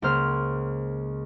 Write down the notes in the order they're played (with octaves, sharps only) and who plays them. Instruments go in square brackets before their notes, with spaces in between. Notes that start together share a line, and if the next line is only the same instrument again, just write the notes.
[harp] C#2 A#3 C5 F6